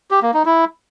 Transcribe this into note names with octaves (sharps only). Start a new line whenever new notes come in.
G4
A#3
D#4
E4